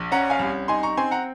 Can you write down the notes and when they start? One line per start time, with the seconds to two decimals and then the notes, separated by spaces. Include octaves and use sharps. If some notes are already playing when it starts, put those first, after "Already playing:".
Already playing: A#1
0.12 C#4 F#5 A#5
0.30 F5 G#5
0.39 C2
0.68 D#4 G#5 C6
0.83 A#5 C#6
0.97 C4 G#5 C6
1.11 F#5 A#5